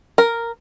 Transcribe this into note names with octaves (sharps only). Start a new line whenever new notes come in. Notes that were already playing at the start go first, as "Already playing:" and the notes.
A#4